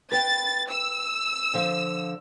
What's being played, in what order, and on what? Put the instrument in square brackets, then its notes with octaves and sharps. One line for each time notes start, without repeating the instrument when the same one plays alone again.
[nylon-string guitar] B4 G5 [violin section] A6
[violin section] E6
[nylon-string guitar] D3 F3 F5